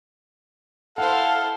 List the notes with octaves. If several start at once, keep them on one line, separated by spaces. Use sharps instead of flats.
E4 A4 C5 F5 F#5